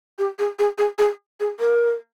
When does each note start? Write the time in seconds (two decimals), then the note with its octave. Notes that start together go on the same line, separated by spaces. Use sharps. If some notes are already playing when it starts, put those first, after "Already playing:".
0.19 G4
0.39 G#4
0.59 G#4
0.78 G#4
0.99 G#4
1.40 G#4
1.60 A#4